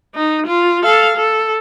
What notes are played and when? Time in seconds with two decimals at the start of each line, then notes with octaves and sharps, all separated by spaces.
0.15 D#4
0.47 F4
0.83 A4 F5
1.17 A4